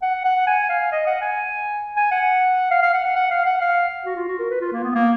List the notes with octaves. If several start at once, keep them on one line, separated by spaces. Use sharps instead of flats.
F#5
F#5
G#5
F5
D#5
F#5
G#5
G#5
F#5
F5
F5
F#5
F#5
F#5
F5
F#5
F5
F#4
F4
F#4
A#4
B4
F4
A#3
B3
A#3